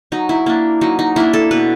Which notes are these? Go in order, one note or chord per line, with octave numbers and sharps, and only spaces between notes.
F#3 D#4
E4
A#3 D4 E4
F#3 D#4
D#4
A#3 D4 E4
A4
B2 B4